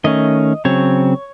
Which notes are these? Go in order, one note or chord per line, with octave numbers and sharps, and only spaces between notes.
D#3 A3 C#4 D#5
C#3 F#3 C4 C#5